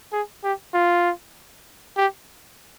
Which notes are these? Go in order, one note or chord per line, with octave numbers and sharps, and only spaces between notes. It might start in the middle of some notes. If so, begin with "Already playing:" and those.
G#4
G4
F4
G4